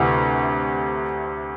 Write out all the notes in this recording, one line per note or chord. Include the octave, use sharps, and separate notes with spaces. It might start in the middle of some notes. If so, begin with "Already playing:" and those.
Already playing: D2 C3 E3